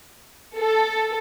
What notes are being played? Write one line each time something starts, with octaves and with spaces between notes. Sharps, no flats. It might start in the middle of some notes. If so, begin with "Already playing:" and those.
A4